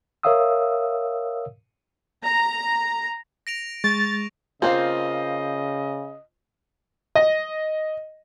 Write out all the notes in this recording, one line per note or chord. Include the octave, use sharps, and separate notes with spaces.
A#4 C#5 E5 F5 D#6 E6
A#5
A#6 D7 F7
G#3 C#6 A6
C#3 A#3 C4 F4 C5 D#5
D#5